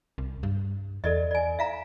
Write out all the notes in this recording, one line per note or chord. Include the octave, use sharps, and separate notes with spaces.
C2
G2
E2 A4 D5 D#5
D5 G#5
E5 F5 A#5